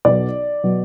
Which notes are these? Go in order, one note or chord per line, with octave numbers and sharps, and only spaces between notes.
B1 B2 F#3 D5
B2 F#3